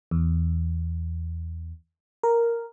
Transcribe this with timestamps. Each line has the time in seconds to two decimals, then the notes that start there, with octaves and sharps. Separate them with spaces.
0.11 E2
2.23 A#4